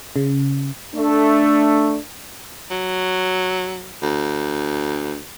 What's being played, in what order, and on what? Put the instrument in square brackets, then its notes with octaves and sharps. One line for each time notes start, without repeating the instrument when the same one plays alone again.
[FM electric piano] C#3
[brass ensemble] A3 D4
[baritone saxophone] F#3
D2